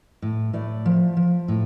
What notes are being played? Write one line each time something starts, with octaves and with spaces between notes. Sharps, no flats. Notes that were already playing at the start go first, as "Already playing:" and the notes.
A2
A2 D5 E5
F3
F3
A2